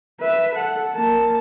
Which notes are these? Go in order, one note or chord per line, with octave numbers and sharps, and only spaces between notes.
B4 E5
A4 F#5
A#3 A5